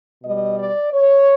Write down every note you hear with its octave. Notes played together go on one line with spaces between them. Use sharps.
B2 G3 D#5
D5
C#5